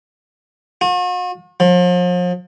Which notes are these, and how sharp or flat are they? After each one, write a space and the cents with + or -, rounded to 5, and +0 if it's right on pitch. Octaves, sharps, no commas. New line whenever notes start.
F#4 -45
F3 +40